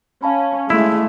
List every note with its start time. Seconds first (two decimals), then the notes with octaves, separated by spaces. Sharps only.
0.23 C#4 F5 A5 B5
0.70 G#3 A3 E4